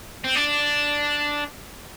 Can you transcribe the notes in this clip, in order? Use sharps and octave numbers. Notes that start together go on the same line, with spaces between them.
C4
D4